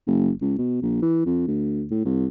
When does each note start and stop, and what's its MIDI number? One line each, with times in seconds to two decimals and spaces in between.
0.07 0.31 30
0.41 0.53 37
0.58 0.80 47
0.82 1.00 34
1.02 1.21 52
1.26 1.47 41
1.47 1.85 38
1.91 2.03 45
2.05 2.26 36